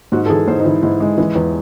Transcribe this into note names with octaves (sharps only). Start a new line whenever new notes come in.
G#2 F#4
A4
E3 G#4
G#2 C5
D#4
E3 E4
G#2 E4
G#3
E3
E2